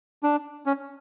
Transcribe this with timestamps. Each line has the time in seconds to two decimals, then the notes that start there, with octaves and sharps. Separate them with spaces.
0.23 D4
0.66 C#4